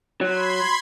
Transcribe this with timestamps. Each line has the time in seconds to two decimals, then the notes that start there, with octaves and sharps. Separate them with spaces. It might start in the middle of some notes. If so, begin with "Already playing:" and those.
0.21 F#3 B5 C6 G#6